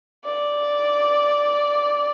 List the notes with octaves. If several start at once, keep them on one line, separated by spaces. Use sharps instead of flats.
D5